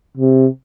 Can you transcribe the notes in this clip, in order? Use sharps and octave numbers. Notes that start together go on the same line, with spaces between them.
C3